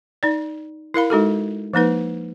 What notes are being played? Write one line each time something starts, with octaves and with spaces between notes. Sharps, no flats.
D#4 D5
E4 A#4 F5 B5
G#3 D#4 F#4 A4
F3 A#3 D#4 B4